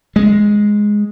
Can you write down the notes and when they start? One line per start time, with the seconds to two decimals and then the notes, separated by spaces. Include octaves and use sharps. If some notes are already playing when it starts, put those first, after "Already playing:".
0.16 G#3